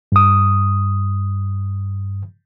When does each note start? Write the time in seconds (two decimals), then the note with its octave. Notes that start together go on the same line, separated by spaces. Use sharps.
0.12 G2 D#6